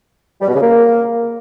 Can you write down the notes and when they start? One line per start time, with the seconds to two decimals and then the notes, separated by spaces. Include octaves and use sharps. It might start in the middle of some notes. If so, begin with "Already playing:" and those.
0.41 G3
0.48 B2
0.55 C#3
0.62 A#3